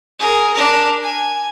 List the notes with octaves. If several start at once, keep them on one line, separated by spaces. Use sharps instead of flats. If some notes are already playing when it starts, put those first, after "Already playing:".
G#4 A#4
D4 A#4
G#5